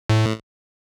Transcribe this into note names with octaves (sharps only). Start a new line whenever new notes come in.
A2